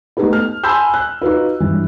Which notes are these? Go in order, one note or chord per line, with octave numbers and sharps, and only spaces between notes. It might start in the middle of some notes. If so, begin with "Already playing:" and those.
A3 B3 D#4 G4 A4 B4
F6
G#5 A5 B5 C6 E6 G6
F#6
D#4 F4 F#4 B4
G2 E3